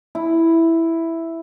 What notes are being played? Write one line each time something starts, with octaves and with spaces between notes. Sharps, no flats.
E4